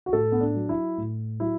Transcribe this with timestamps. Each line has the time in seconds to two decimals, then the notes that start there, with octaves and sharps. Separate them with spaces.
0.06 F#4
0.13 A2 A4
0.32 B3
0.41 D4
0.55 F#3
0.69 E4
0.97 A2
1.40 F#3 E4